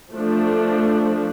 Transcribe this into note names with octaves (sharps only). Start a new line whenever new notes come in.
F3 A3 D4